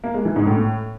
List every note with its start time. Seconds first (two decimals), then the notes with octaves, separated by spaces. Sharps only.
0.04 A#3
0.14 G#3
0.25 E3
0.36 G#2
0.47 A2